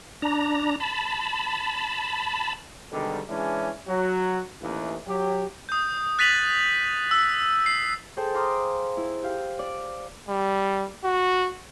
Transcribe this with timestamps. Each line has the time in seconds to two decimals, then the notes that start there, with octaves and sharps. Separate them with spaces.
0.22 D4 A#5
0.80 A5 B5
2.92 G#2 B2 D3 D#3 G3
3.28 C#3 E3 G#3 C#4 D4 E4
3.87 F#3 F#4
4.61 A1 D#2 E3
5.07 F#3 G4
5.69 D#6 G6
6.19 F#6 A6 B6 D#7 F7 F#7
7.11 E6
7.66 C7
8.17 G#4 A4 C5 G5
8.34 F5 A#5 C6 D6 D#6 F6
8.97 E4
9.23 G4 F5
9.59 D5
10.29 G3
11.04 F#4